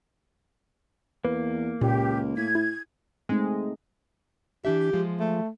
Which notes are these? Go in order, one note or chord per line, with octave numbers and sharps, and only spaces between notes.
E2 A#3 B4
C#2 A#2 G4
A2 G#6 B6
E4
G#3 A3 C4 D#4
E3 D4 G4 E5
F3 G#3 F4
A3